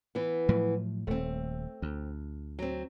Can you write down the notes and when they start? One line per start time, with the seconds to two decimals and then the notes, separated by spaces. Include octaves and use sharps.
0.15 E3 B3
0.49 A2 F3 F#3
1.07 D#1 A3 C4
1.82 D2
2.59 F#3 C4